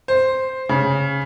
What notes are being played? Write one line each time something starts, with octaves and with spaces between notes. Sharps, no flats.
C5
C#3